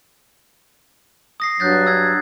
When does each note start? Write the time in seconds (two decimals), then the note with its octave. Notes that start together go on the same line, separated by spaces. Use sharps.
1.40 D#6 A#6 C7
1.60 G2 F#3 F#6 G6 A6
1.87 E6 G#6 A#6